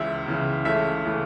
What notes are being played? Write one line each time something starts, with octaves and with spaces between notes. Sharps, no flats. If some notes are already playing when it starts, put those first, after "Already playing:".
Already playing: C#2 C#3 E3 E5
C#2 C#3 E3
C#2 C#3 E3 A3 E5
C#3 E3 A3